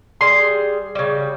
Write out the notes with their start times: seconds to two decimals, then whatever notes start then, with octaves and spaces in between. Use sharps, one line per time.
0.21 G3 G#4 C6
0.95 C#3 G3